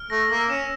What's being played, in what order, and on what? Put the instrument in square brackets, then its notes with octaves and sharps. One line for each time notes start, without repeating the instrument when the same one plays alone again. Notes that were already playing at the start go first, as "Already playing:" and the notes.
Already playing: [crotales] F6
[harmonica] A3 [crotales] A#6
[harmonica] A#3 [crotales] E6
[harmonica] C#4 [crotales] E7